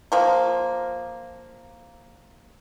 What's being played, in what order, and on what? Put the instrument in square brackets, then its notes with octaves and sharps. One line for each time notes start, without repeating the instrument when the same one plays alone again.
[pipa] F3 A#3